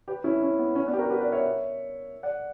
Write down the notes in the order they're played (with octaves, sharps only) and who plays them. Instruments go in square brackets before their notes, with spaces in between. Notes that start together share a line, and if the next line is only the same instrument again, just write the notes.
[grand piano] G4 B4
C#4 E4
C#4
B3
C#4
B3 D4
G4
F#4 A#4
G4 B4
B4 D5
C#5 E5
D5 F#5